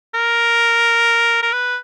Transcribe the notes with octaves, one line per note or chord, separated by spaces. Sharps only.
A#4
A#4
B4